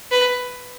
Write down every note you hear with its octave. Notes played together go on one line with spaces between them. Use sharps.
B4